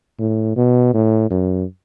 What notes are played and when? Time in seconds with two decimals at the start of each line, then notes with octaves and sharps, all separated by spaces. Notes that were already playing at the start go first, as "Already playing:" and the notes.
0.19 A2
0.56 B2
0.93 A2
1.30 F#2